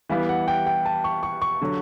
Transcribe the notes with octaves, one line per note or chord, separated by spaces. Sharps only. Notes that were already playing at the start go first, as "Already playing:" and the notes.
E3 G3 B3 E4 F5
F#5
G5
G5
A5
C#6
C#6
C#6
D3 F#3